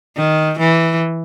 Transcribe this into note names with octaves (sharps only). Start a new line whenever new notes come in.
D#3
E3